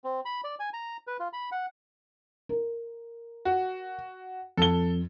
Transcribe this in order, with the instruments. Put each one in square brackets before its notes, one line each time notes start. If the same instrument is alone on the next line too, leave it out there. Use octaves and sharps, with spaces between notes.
[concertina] C4
B5
D5
G#5
A#5
B4
F4
B5
F#5
[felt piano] A#4
[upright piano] F#4
[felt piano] F2 [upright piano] A4 G7